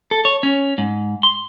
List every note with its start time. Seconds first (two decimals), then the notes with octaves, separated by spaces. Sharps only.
0.11 A4
0.25 C#5
0.43 C#4
0.78 G#2
1.23 C6